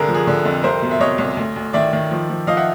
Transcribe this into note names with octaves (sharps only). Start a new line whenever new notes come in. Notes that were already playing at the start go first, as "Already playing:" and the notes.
Already playing: C2 D3 G#4 A#4
F3
G#4
D3
F2
C2 A#4 C5
B2
E5
C2 C#5 D#5
C2
D2
D2
D#3 D5 E5
D#3
F3
F3
F3 D#5 F5
E5 F#5